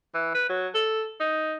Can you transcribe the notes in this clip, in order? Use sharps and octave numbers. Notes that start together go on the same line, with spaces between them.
E3
B4
F#3
A4
D#4